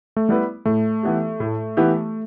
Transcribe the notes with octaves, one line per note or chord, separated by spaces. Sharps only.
A3
G3 B3 E4 B4
A2 A3
E3 B3 E4 G4
A2
E3 B3 E4 G4